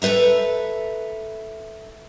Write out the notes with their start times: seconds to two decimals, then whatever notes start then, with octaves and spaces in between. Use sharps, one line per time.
0.02 A4 B4 C5 E5 A#5